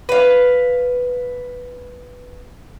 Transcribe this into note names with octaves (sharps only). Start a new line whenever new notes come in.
B4 F5